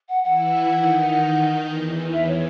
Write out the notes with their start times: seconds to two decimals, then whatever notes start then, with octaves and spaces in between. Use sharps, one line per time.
0.09 F#5
0.24 E3 E4 F#5
0.71 D#3 D#4
1.64 E2 E3
2.13 E5
2.27 C#5